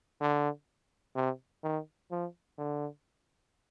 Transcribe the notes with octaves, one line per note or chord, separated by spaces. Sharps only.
D3
C3
D#3
F3
D3